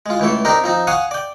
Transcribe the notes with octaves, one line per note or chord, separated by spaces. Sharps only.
G#3 F4
C#2 E3 A3 A4
C4 D4 D#4 G4 A#4
F3 C4 D#4
F5 F#5 G#5 C#6 D#6
D5 G5